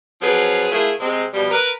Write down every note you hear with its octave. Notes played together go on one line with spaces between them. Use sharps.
F3 F#3 C4 G#4 B4
A3 E4 F4 G#4 A#4
C3 G#3 C4
B2 F3 G3
A#4 B4